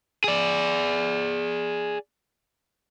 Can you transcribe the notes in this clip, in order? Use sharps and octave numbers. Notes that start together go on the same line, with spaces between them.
G#4 D5